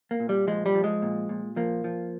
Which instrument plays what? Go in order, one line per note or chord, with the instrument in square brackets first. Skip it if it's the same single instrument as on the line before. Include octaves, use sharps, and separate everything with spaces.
[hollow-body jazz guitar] A#3
A#2
G3
F3 G#3
G3
F3
G#3
A#2
A#2
F3 A#3
F3